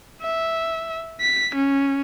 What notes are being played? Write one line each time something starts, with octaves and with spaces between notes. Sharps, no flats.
E5
B6
C#4